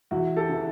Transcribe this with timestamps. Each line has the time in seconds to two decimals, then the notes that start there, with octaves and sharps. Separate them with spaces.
0.11 E2 E4 F#4
0.36 G4 A4
0.49 C#3 E3